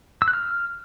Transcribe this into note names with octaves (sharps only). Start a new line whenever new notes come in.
E6
F#6
F6